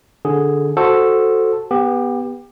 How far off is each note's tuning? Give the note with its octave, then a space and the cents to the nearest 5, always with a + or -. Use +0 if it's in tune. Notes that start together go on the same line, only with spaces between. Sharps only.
D3 +0 G#4 +0
F#4 -5 A4 +0 C5 +0
B3 -10 G4 +20